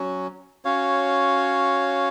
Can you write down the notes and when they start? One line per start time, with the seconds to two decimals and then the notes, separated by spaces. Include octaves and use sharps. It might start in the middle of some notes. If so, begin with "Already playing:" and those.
Already playing: F#3 C#4 F#4
0.65 C#4 F#4 C#5 F5